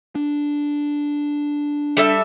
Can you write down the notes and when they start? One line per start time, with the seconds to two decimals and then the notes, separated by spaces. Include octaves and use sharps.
0.15 D4
1.97 G3 A4 E5